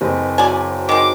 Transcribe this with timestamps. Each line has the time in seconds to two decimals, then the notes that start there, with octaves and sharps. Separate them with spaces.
0.01 F#1 C4 B4 D#5
0.38 F#3 F#4 D5 E5 G#5
0.89 D#3 G#3 D6